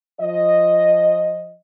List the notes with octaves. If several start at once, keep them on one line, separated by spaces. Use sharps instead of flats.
F3 D#5